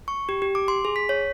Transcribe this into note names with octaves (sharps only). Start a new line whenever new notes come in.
C#6
G4
G4
D6
C6
G#4
B6
C#5